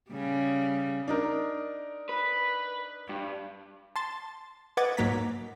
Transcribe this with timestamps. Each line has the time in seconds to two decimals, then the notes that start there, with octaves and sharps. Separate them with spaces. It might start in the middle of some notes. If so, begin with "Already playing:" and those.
0.11 C#3 G3
1.08 D4 D#4 A#4
2.09 B4
3.09 G2
3.96 A5 C6 A6
4.77 B4 D#5 F#5 D6 G#6 A6
4.97 G#2 F#3 A#3 A#5 B6